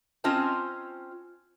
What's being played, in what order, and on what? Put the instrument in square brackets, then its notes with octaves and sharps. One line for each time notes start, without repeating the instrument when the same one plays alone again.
[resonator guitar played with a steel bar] C4 C#4 F4 C5 D#5 A5